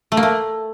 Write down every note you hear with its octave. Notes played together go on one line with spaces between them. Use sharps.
A3
A#3
A3